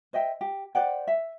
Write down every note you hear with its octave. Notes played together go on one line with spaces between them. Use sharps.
C5 D#5 E5 G5
G4
C5 D5 F#5 G5
E5